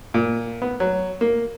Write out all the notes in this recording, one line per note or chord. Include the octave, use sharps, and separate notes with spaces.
A#2
B3
F#3
A#3